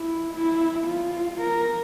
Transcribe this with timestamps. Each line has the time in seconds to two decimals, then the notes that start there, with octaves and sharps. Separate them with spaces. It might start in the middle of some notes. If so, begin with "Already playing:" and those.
Already playing: E4
0.34 E4
0.87 F4
1.41 A#4